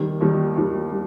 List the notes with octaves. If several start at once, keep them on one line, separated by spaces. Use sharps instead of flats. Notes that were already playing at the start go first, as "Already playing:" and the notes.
Already playing: D#2 D#3 G3
D#2 D#3 G3
D#2 D#3 G3
G3